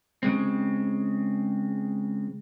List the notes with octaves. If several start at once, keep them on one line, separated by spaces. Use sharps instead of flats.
C#3 G#3 C4